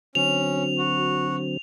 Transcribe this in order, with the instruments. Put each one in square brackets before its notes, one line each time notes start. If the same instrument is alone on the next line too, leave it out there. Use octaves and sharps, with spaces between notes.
[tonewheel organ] D3 F#3 C4 [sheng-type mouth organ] C#4 [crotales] F7
[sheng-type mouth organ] F#4